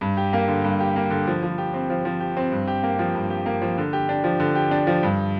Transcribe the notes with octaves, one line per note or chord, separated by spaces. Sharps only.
G2
G4
A#3
D3
G2
G4
A#3
D3
F3
F3
G4
C4
F3
F3
G4
C4
G2
G4
A#3
F3
G2
G4
A#3
F3
D3
G4
D4
F3
D3
G4
D4
F3
G2